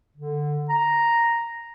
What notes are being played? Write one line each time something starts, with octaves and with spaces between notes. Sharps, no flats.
D3
A#5